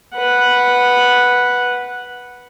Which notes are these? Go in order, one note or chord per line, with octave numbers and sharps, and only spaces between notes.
B4 F#5